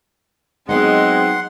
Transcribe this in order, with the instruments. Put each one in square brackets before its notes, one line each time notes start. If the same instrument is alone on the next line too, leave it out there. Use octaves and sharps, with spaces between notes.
[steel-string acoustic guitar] F#3 B3 D#4 [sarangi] G#3 [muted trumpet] C4 [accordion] F#5 C6